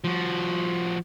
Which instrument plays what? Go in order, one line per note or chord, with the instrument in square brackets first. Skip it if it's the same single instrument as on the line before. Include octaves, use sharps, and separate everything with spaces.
[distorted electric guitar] F3 F#4